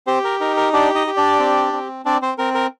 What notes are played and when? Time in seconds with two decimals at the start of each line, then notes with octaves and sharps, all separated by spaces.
0.07 C4 G4 C5
0.25 A#4
0.40 D#4 A#4
0.57 A#4
0.73 D4 G4 D5
0.95 D#4 D#5
1.07 G4
1.17 D4 D5
1.40 C4
1.73 C4
2.05 C4 D4 D5
2.22 C4 C5
2.38 C4 A#4
2.55 A#4